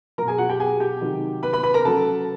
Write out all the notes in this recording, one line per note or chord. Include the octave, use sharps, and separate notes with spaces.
B2 F#3 A#4 A#5
G#4 G#5
F#4 F#5
G4 G5
G#4 G#5
G4 G5
C3 D#3 F#3
B4 B5
B4 B5
B4 B5
A#4 A#5
C#3 F#3 A4 A5